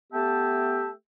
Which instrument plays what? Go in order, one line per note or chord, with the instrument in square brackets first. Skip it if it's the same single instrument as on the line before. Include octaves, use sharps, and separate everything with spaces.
[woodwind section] A3 B3 G4 E5 G5 A5